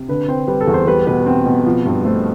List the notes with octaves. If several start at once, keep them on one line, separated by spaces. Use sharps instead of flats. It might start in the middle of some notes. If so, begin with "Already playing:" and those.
Already playing: C3
D3 B4
C4 C5
G3 B4
A4
E2
C5
G3 B4
B2 B4
C4
B2
F3
G2
A3 C5